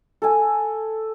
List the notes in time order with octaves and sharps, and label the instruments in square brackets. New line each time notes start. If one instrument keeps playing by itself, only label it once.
[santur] A4 G#5